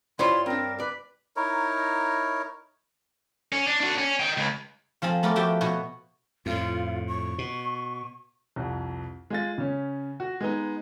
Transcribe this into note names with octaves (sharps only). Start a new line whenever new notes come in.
G2 E4 F4 C5 C#5 C6
C4 D4 A#4
B4 D5
D#4 E4 A#4 C#5
C#4
D4
D4 F#4
C#4
D#5 G5
C#2
F3 C4 G#4 A4
A3 B3 A4 A#4 D5
F3 F#4 G4 A4 E5 G5
B2 F#4 C#5
F2 A2 F4
C#6
B2
C2 F2
G#3 F4 A6
C#3 C#4
F#4
G#3 B3 D#4